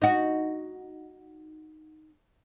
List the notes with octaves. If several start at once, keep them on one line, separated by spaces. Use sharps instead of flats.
D#4 F#4